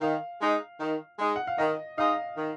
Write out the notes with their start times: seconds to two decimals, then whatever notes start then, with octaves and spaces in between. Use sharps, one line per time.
0.01 D#3 F5
0.41 G#3 D#4
0.80 D#3
1.19 G#3 D#4
1.36 F#5
1.47 F5
1.58 D#3 D#5
1.97 G#3 D#4 F5
2.37 D#3